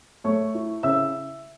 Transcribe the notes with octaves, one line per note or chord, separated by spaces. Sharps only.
A3 C#5 C#6
E4
C#3 E5 E6